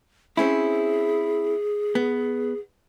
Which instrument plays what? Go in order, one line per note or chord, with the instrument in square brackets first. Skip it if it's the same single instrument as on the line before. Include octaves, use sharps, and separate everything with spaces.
[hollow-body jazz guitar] C4 C#4 E4 [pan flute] G#4
[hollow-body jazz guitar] B3